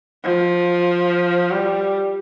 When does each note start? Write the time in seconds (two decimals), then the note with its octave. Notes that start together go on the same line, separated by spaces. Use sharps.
0.24 F3
1.51 G3